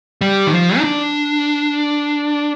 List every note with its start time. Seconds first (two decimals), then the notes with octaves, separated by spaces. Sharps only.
0.21 G3
0.47 D#3
0.53 F3
0.78 D#4
0.84 D4